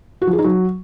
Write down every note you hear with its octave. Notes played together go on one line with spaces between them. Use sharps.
F#4
F3
G#4
D#4
F#3